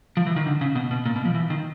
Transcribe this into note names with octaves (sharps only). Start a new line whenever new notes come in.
F3
E3
D#3
D3
C#3
B2
B2
A#2
B2
F3
E3
D#3